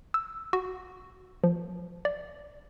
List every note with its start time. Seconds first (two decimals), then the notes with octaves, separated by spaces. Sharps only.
0.14 E6
0.53 F#4
1.44 F3
2.05 D5